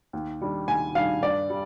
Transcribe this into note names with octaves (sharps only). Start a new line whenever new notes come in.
D#2
D#3 G3 D4
D#2 G#5
D#3 G3 D4 F5
G2 D5
G3